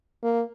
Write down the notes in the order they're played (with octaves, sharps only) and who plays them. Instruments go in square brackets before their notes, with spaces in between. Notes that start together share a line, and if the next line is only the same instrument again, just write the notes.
[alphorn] A#3